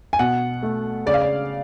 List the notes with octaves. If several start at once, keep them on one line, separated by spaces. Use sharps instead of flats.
G#5
B2 F#5
A3
C#3 D5
F5
D5